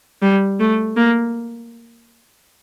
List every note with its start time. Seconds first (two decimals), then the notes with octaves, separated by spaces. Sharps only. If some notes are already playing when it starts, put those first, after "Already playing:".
0.22 G3
0.60 A3
0.97 A#3